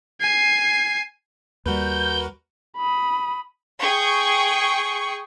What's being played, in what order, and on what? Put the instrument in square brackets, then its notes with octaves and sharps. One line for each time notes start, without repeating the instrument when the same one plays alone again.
[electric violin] G#5 C7
[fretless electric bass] D#2 G3 [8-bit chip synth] F#4 A#4 B4 [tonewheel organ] G6
[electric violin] B5 D#6
[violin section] G#4 G5 C#6